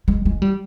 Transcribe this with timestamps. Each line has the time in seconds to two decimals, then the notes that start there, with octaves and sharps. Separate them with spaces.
0.08 G#3
0.25 G#3
0.42 G3